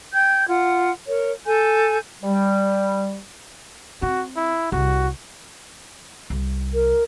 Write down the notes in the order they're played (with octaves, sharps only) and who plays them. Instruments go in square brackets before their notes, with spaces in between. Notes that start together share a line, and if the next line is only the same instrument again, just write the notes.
[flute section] G5 G6 G#6
F4 F#5
A#4 C#5
A4 G#5 G6
[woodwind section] G3
[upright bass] C4 [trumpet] F#4
[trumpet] E4
[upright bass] C2 [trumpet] F#4
[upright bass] C2
[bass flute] A#4